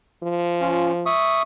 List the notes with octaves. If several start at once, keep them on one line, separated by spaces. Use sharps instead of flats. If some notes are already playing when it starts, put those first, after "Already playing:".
F3
C#4 F4
E5 C#6 D#6